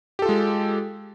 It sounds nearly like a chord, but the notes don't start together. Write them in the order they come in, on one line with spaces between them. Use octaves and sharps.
G4 A4 F4 G#3